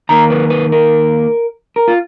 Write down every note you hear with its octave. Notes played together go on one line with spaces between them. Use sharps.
D#2 D#3 A#3 A#5
B4
B4
A#4
A#4
F4